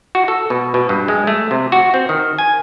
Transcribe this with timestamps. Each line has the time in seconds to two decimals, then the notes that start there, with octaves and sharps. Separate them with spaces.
0.15 F#4
0.28 A4
0.50 B2
0.74 B2
0.89 G2
1.08 G#3
1.27 A3
1.51 C3
1.72 F#4
1.94 C4
2.09 D#3
2.39 G#5